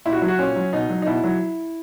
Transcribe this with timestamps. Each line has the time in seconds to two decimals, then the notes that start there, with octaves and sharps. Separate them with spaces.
0.06 A#2 E4
0.13 F#4
0.17 F#3 E4
0.28 F#4
0.39 A#2 C#4
0.56 F#3
0.73 B2 D#4
0.90 F#3
1.02 D#4
1.07 B2 E4
1.24 F#3